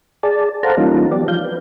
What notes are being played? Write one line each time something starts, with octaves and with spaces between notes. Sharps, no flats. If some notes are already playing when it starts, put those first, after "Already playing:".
G#4 D5 A5
A4 C5 F5 F#5 A5 A#5
E3 G3 A#3 C#4 D#4 F4
F#3 B3 G4 D5
F3 F5 G6
B4